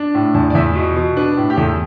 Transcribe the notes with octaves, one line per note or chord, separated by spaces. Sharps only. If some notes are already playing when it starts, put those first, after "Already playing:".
Already playing: D4
A2
E2 A5
D5
E2 E5
B2
B2
D4 B4
A2
G4
E2 A4